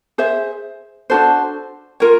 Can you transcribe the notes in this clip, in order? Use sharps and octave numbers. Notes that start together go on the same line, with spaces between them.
G#4 C5 E5
D4 F#4 A4 C5
F4 A#4 C#5